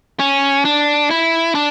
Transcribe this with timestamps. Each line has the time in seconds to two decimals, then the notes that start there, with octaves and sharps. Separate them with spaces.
0.19 C#4
0.65 D4
1.10 E4
1.55 D4